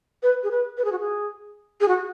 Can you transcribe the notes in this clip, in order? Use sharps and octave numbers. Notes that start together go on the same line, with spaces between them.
B4
G#4
B4
B4
G#4
F#4
G#4
G#4
F#4